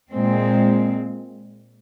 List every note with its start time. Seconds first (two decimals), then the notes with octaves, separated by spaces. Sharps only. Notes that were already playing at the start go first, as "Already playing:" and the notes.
0.11 A#2 G#3 C4